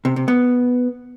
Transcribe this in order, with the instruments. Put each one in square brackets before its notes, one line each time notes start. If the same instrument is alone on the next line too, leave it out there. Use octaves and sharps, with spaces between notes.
[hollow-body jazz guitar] C3
C3
B3